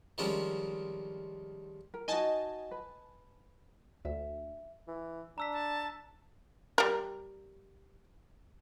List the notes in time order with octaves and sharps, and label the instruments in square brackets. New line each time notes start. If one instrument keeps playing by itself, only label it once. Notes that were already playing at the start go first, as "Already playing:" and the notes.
[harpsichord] D#3 F3 G3 G#3 C4 C#4
[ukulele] A#4
[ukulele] D#4 F4 F#4 [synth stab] D#5 G#5 A5
[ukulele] B4
[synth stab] D2 [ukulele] E5
[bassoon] E3
[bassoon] D4 [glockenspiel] A#5 E6 B6
[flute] A5
[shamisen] G3 A#4